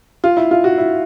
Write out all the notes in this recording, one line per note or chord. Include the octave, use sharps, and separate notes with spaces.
F4
E4
F4
F#4
E4